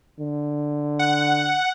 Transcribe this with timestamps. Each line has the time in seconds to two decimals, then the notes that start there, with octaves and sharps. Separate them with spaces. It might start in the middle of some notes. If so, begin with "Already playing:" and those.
0.20 D3
0.99 F#5